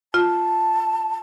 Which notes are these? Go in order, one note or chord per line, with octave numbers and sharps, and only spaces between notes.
F4 A5